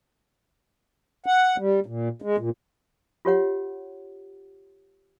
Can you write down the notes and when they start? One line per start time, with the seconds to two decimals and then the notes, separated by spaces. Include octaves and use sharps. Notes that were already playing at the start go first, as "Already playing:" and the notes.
1.26 F#5
1.58 G3
1.86 A#2
2.22 G#3
2.38 A#2
3.25 F4 G4 C#5 F#5